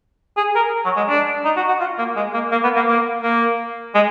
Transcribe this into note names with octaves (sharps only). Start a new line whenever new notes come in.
G#4
A#4
F#3
G#3
D4
D#4
F#4
F#4
F4
A#3
G#3
A#3
A#3
B3
A#3
A#3
A#3
G#3